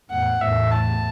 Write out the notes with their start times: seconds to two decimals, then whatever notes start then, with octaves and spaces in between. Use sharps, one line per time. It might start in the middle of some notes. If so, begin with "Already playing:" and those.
0.11 E2 A2 F#5
0.41 E2 A2 E5
0.71 A5